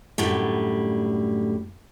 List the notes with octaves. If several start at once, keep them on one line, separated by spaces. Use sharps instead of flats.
F#2 A2 D3 G3